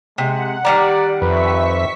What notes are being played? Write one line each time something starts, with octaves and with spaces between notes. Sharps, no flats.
C3 G#3 F#5
D#3 G3 D5 A#5
F2 B4 E5 C#6 B6